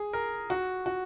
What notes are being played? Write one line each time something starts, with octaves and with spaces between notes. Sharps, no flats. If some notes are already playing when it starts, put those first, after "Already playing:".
Already playing: G#4
A#4
F#4
F#4